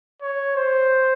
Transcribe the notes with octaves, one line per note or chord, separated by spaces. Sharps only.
C#5
C5